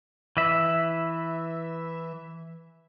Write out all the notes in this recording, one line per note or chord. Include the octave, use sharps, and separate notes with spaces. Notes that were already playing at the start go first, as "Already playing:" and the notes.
E3 E5